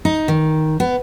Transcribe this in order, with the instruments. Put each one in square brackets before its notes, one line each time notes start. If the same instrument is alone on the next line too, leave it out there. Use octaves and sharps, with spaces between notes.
[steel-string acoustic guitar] D#4
D#3
B3